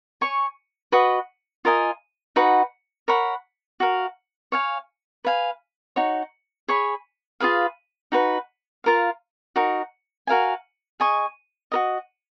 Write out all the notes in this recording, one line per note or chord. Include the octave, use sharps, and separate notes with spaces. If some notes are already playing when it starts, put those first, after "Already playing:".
C#5 G#5 C#6
F#4 B4 D#5
F4 A#4 D#5 G#5
D#4 F#4 B4 F#5
A#4 C#5 F#5 B5
F#4 A#4 F5
C#5 F5 G#5
B4 F5 G#5
D#4 F#4 C#5
G#4 C#5 G#5 B5
F4 G#4 B4 F5
D#4 F#4 B4
F4 A#4 F5
D#4 F#4 A#4
F#4 A#4 F5 G#5
G#4 D#5 G#5 C#6
F#4 A#4 D#5